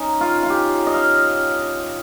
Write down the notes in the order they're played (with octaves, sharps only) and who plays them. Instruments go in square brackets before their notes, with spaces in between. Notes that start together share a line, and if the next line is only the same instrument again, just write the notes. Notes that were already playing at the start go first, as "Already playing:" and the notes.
Already playing: [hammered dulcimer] C#4 D#4
F4
F4
G4
D#5
F5